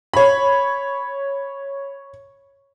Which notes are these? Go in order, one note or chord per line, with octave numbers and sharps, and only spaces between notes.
C#5 B5